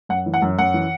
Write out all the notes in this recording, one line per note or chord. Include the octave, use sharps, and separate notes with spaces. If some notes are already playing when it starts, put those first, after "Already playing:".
F#2 F#5
E3
F#5
F#2
F#2 F#5
E3